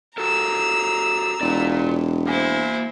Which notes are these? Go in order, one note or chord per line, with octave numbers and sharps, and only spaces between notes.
F#4 A4 A#4 A#5 E6
E1 F4 D5
A#3 E4 C5 G#5